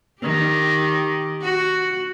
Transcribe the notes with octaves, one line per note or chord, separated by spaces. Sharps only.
D#3 G4
F#4